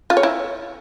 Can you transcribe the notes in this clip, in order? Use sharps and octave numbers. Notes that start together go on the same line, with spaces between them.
F4
C#5
E4